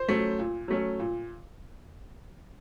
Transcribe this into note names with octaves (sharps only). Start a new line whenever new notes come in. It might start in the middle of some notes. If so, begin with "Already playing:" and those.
Already playing: C5
F#3 A3 C#4
A#2
F#3 A3 C#4
A#2